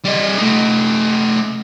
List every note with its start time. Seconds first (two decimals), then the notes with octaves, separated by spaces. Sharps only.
0.05 G3 D#5
0.38 A3 D#4